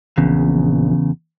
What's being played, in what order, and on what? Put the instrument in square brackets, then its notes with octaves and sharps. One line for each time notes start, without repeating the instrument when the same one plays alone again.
[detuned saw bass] A#1 [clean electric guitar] E2 C#3